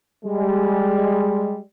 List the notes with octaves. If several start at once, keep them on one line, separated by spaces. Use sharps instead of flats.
G3 G#3